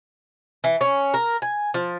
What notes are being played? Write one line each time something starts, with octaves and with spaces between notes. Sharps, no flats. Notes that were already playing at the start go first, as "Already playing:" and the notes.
E3
C#4
A#4
G#5
F3